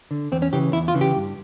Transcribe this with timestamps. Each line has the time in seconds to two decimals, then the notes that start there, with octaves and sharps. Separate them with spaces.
0.11 D3
0.32 E2 C4
0.42 C#4
0.53 C#3 E3 G4
0.73 E2 E4
0.88 F4
0.95 C#3 E3
1.01 G4
1.16 G2